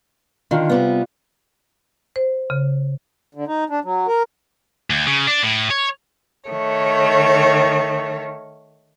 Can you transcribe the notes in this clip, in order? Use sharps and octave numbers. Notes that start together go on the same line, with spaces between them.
D3 D#3 F4
C3 G3 B3
C5
C#3
D3
D#4
D4
F#3
A#4
D2
C#3
D4
A2
C#5
D#3 A3 C#5